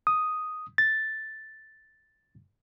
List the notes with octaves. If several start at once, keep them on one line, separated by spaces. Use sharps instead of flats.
D#6
A6